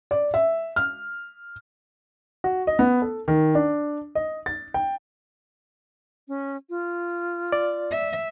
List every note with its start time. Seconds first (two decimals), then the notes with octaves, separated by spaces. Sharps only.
0.11 D5
0.34 E5
0.76 F6
2.44 F#4
2.67 D#5
2.79 B3
3.02 A4
3.28 D#3
3.55 D4
4.15 D#5
4.46 A6
4.74 G5
6.28 C#4
6.70 F4
7.52 D5
7.91 E5